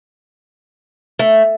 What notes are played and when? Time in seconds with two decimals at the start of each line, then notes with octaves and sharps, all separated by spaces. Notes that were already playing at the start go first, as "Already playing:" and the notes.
1.19 A3